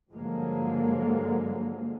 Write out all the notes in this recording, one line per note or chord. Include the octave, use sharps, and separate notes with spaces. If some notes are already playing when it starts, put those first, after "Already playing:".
G2 D3 F3 F#3 G#3 A#3